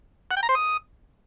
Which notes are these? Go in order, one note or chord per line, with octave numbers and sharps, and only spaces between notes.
F#5
G5
A#5
C5
D#6